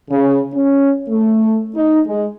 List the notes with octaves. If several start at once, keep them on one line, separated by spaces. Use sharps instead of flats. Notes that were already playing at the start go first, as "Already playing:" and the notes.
C#3
C#4
A3
D#4
G#3